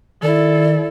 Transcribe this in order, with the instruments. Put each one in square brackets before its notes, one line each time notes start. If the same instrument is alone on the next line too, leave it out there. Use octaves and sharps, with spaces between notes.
[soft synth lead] D#3 [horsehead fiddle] E4 A4 [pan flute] D5